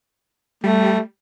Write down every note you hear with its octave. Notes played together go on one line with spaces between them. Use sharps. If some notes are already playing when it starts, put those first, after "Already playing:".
G3 A3